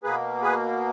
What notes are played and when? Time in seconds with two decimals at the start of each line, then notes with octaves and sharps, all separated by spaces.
0.04 B2 A#3 G#4 B4
0.43 G#4 B4